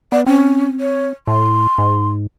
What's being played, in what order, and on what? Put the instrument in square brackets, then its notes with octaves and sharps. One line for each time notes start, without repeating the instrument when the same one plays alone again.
[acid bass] B3 [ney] D5
[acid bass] C4 [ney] C#4
[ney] C#5
[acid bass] A2 [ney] C6
[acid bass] G#2